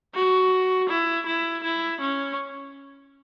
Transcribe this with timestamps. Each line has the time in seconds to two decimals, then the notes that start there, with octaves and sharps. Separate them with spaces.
0.14 F#4
0.89 E4
1.26 E4
1.63 E4
2.01 C#4